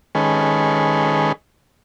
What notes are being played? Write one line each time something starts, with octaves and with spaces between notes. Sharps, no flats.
D#3 G#3 C#4 G#4 A4 B4